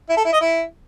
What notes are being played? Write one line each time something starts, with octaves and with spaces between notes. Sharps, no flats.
E4
A4
E4
D#5
E4